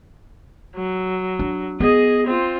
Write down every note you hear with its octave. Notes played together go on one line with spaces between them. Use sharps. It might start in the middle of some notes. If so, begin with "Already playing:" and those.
F#3
D4
B3 G#4 D#5
C4 F4